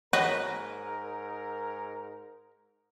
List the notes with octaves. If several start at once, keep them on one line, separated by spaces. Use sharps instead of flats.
G#2 F#4 A#4 B4 C#5 D#5 F5 F#5